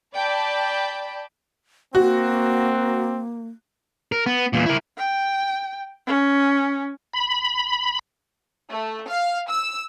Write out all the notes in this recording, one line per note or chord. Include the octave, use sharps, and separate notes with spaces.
D5 G5 A5 B5
A#3 C4 F#4
A#4
B3
E2 A#2
E4 A#4
G5
C#4
B5
A3
F5
E6